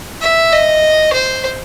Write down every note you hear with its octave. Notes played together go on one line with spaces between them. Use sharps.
E5
D#5
C5